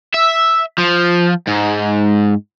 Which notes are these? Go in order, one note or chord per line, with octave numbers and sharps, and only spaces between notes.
E5
F3
G#2